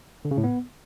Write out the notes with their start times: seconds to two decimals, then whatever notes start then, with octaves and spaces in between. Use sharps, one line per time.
0.25 D3
0.31 C#3
0.37 A2
0.44 B3